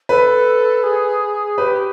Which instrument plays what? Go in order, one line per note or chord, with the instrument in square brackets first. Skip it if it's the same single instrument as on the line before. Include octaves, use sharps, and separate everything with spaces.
[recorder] A4 [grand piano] B4
[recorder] G#4
[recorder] G4 [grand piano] B4